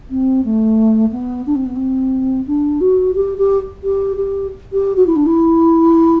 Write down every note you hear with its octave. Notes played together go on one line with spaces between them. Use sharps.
C4
A3
B3
D4
C4
B3
C4
D4
F#4
G4
G4
G4
G4
G4
F#4
E4
D4
E4